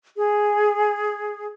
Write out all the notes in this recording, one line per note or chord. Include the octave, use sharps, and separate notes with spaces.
G#4